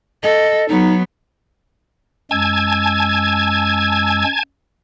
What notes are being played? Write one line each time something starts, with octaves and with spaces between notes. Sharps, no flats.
A4 D#5
F#3 B3 D#4
F#2 G#3 G#5 A5 E6 G#6